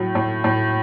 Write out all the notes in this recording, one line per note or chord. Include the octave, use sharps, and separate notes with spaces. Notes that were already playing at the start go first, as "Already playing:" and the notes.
Already playing: A2 F#3
A2
A2